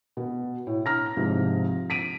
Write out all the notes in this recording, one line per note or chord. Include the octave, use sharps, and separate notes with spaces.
B2
A2
A#5 F6 A#6
G#2 C3 F3
B6 D7 D#7